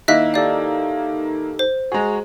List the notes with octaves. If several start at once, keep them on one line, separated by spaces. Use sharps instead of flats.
D#3 A#3 E4 D#5 E5 F#6 B6
D#4 G4 A4 D5 F5
C5
G#3 F#4 G#4 A#5